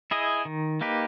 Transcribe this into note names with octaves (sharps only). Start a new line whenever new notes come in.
E4 G#4 D#5
D#3
A#3 D#4 G4 B4